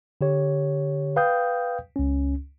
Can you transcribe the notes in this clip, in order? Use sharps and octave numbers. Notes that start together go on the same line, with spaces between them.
D3 G4 C#5
B4 F5 G5 D#6 G6
C#2 C#4